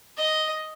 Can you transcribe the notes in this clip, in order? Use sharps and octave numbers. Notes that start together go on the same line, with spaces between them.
D#5